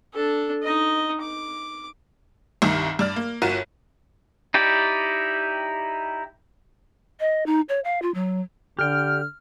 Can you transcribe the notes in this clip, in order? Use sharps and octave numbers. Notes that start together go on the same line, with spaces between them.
D4 A4
D#4 D#5
D6
C2 G2 D#3 D#4
G2 D5 F6
A#3
G1 F4 F#4 A#4 D#7 E7
D#4 E4 G4 D5
D#5
D#4
C#5
F5
F4
F#3
D3 G4 G5 F6